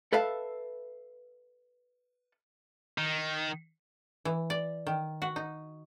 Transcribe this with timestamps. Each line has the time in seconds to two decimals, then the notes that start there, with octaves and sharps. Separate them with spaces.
0.13 A4 B4 E5 F5 A5
2.98 D#3
4.25 E3
4.50 D5
4.87 D#3
5.22 F#4
5.36 D#4